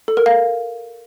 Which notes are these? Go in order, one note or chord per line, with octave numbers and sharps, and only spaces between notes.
A4
A#4
F5